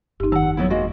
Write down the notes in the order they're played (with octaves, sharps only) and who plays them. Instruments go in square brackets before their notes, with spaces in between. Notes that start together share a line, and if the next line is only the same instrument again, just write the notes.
[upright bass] G1 F2 [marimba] D#4 G4
[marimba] D#3 E6 [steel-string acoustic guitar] F#5 A5
[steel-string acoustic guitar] F#3 B3 E4
G#3 A#3 F#4